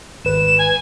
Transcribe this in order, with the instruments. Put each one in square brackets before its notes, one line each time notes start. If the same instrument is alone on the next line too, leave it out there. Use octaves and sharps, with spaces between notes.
[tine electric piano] G#1 B4 [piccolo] E7
[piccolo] G#5